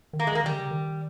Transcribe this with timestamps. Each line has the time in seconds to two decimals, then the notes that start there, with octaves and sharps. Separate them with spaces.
0.13 D#3
0.20 A#3
0.27 G#3
0.32 D#3
0.35 A#3
0.44 D#3 G3
0.52 C#3
0.71 D#3